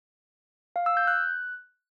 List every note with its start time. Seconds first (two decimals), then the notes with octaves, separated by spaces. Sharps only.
0.76 F5
0.86 E6
0.97 G6
1.07 F#6